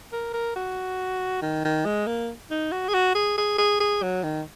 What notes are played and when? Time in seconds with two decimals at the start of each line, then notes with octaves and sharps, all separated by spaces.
0.12 A#4
0.34 A#4
0.56 F#4
1.42 D#3
1.65 D#3
1.85 G#3
2.07 A#3
2.51 D#4
2.72 F#4
2.88 G#4
2.94 F#4
3.15 G#4
3.38 G#4
3.58 G#4
3.80 G#4
4.03 F#3
4.23 D#3